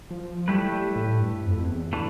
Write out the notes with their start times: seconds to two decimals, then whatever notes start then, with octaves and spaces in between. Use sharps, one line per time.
0.11 F3
0.48 G3 A3 E4 G4 B4
0.72 G3
0.96 A2
1.20 G2
1.45 F2
1.57 F2
1.69 E2
1.93 E3 A3 D4